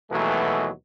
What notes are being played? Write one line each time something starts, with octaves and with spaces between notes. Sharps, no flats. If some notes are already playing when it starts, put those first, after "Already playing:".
D#2 B2 E3 F#3 G#3 A3